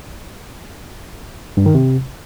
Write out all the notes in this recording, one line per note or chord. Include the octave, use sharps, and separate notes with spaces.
G2
D#3
C3